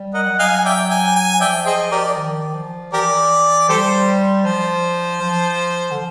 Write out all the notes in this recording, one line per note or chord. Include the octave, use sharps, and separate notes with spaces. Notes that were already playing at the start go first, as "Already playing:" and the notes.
Already playing: G3
A#4 D#5 F#5
F#3
D#5 F5 G#5
D5 E5 G5
G#5
G#5
F3 D5 E5 G5
G#4 C5 D#5
G4 A#4 D5
D#3
F3
E3 G4 A#4 D5
G3 G4 A4 C5
F3 C5
F3
D3